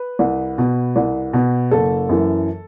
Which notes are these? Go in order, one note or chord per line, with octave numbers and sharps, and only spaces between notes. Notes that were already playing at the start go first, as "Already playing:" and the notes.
Already playing: B4
C2
B2
C2
B2
F#1 A4
F#2 E3